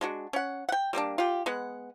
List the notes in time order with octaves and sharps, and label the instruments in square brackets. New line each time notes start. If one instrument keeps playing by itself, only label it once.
[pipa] G#3 D4 F#4
C#4 F#5
F#5 G5
G3 A#3 C4 D4
F4 G4
G#3 B3 F#5